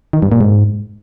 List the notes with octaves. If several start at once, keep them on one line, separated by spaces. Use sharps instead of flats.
D#3
G2
A#2
G#2